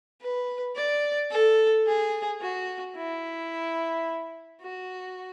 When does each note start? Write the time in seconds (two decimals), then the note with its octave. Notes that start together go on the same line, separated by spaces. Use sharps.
0.21 B4
0.76 D5
1.30 A4
1.86 G#4
2.41 F#4
2.95 E4
4.61 F#4